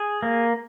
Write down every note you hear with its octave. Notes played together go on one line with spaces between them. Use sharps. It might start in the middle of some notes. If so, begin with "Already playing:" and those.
Already playing: G#4
A#3